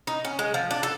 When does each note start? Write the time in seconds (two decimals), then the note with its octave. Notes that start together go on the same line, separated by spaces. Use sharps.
0.07 D#4
0.25 C#4
0.39 G#3
0.54 F3
0.71 D4
0.83 A4